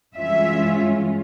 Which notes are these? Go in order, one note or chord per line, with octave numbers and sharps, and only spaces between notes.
G2 E3 G#3 C#4 F4 E5